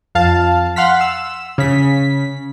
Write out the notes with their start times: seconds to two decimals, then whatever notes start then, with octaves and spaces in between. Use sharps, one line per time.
0.15 F2 F5 A5
0.76 F5 F#5 C6 F6 B6
1.01 E6
1.58 C#3 B6